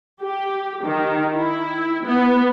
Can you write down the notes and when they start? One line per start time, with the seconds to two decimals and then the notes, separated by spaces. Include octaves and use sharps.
0.21 G4
0.83 D#3
1.31 E4
2.05 B3